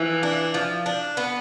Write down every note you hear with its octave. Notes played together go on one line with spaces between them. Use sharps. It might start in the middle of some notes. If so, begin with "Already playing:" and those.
Already playing: E3 F3
D4
F3
D4
B3